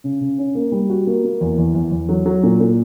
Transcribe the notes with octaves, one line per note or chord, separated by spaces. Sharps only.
C#3
C#3
C#4
A#3
G3
F#4
A#3
A#3
E2
E2
E2
E2
F#3
F#3
A#2
A#2